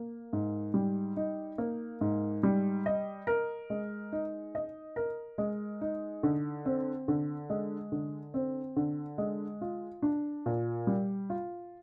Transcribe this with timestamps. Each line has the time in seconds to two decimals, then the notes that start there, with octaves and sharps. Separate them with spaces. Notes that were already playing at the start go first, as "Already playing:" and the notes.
Already playing: A#3
0.33 G#2
0.74 G3
1.17 D#4
1.58 A#3
2.01 G#2
2.43 G3
2.86 D#5
3.27 A#4
3.70 G#3
4.12 D#4
4.55 D#5
4.96 A#4
5.38 G#3
5.81 D#4
6.23 D3
6.65 C4
7.08 D3
7.50 G#3
7.92 D3
8.34 C4
8.76 D3
9.18 G#3
9.61 F4
10.02 D4
10.46 A#2
10.87 G3
11.30 F4